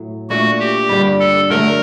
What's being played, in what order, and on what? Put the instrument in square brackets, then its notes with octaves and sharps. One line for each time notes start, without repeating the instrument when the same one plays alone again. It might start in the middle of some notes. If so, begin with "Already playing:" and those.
Already playing: [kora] A2 F#3
[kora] A#2 A3 D4 [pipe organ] F#4
[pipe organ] G4
[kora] G2 D3 G3
[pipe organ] A4
[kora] D3 F#3 A3 [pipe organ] A#4